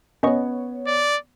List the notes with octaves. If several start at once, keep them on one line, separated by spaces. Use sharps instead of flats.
B3 C#4 C#5 D#5 C#6
D5